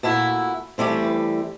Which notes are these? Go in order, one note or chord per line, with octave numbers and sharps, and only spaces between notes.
A#2 A3 E4 F#4
E3 G3 A3 C4